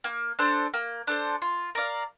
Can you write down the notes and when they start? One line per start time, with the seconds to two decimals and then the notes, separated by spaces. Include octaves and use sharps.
0.04 A#3
0.39 D4 A4 C5
0.74 A#3
1.07 D4 A4 C5
1.42 F4
1.75 A#4 D5 F5